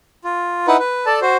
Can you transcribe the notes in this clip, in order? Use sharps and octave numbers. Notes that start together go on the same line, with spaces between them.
F4
D#4 E4 B4 F#5
B4
A4 D5 A5
F#4 C5